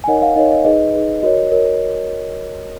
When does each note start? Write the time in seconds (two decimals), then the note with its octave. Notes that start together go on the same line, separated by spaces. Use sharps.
0.04 G#5
0.08 D#4 A#4 C#5 D#5 F#5
0.22 F5
0.36 D#4 A#4 C#5 D#5
0.52 D#5
0.65 D#4 G#4 B4 D#5
0.93 D#4 G#4 B4
1.22 F#4 A#4 C#5 D#5
1.52 F#4 A#4 C#5